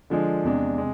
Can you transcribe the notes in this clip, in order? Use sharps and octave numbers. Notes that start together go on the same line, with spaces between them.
D3 F3 G#3 D4
E2 C3 G#3 D4
C3 G#3